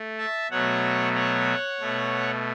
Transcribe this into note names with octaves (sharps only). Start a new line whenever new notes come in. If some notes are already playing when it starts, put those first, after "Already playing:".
Already playing: A3
E5 A5
B2 F#3 A3 C#5 F#5
C#5 F#5
B2 A3